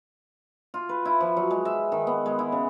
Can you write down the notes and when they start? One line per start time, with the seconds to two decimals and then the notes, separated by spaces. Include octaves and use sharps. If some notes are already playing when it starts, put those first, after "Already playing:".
0.74 F4
0.89 B4
1.05 E4
1.20 F3
1.37 F#3
1.51 G#3
1.65 E5
1.92 D#3
2.07 B3
2.26 G#3
2.39 E4
2.52 C#3